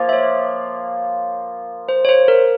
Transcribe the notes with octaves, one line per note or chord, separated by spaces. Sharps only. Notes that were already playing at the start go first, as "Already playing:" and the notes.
Already playing: F3 A#3 F4
E5
C#5
C5
C#5
C5
A#4